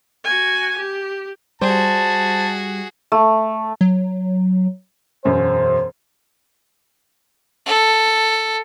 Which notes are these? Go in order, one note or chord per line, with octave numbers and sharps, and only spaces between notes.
F#4 G#5
G4
G3 F#4 G#4 C5 A5
A3
F#3
E1 F#2 C#4 C5
A4